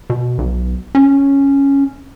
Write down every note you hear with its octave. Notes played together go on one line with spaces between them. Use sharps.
B2
B1
C#4